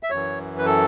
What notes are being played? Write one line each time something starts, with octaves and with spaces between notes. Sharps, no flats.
E5
F#2 E3 C#5
B4
A4